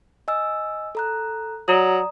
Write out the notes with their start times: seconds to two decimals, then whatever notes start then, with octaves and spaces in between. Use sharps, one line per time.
0.28 D#5 G#5 E6
0.95 A4 A#5 F#6
1.68 F#3 D5 A#5 D#6